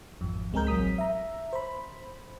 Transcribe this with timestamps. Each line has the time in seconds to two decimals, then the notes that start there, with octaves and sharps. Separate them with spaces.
0.21 G#1 F2
0.53 C#2 G#3 C4 G#4 A#4 G6
0.67 A1 F#3 D#6 B6
0.98 E5 A#5
1.53 C5 B5